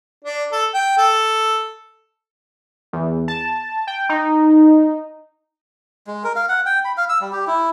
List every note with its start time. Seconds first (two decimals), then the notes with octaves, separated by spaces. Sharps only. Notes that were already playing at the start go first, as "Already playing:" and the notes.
0.25 D4
0.52 A4
0.74 G5
0.98 A4
2.93 E2
3.28 A5
3.87 G5
4.09 D#4
6.07 G#3
6.24 A#4
6.36 F5
6.49 F#5
6.66 G5
6.85 B5
6.97 F5
7.09 E6
7.21 G3
7.32 G4
7.47 E4